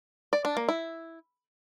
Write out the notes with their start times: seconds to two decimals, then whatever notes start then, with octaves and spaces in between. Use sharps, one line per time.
0.33 D5
0.45 D4
0.57 A#3
0.69 E4